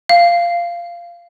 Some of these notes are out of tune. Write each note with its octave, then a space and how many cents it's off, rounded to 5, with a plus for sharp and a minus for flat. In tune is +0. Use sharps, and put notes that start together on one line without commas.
F5 -15